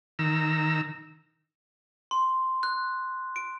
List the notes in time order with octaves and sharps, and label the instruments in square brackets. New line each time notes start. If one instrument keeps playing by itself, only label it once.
[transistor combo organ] D#3 A#5 E6
[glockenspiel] C6
F#6
D7